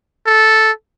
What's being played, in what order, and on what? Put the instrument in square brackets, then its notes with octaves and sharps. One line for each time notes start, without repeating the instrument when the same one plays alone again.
[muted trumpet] A4